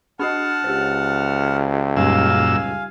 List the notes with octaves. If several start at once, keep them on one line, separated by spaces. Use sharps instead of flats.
D4 F#4 D#5 F#5 A5 F6
C#2 G4 C5
F#2 A#2 G3 D#4 G4 F5 G#5 E6